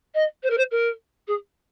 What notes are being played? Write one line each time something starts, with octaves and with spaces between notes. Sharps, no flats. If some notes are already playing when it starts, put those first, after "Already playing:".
D#5
C5
A#4
C5
A#4
G#4